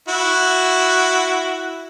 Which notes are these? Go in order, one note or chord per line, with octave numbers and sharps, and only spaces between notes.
E4 F#4